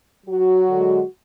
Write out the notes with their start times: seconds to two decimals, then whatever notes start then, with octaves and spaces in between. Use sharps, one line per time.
0.27 F#3 F#4
0.69 D3 G#3